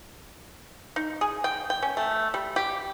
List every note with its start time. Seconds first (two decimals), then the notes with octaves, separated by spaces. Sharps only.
0.96 D#4
1.21 G#4
1.44 G5
1.70 G5
1.82 C#4
1.97 A3
2.34 G3
2.56 G4